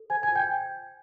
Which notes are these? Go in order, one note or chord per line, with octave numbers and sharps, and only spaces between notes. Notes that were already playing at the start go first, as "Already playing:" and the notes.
Already playing: A4
C5 G#5 G#6
G#5 G#6
F4
G5 G6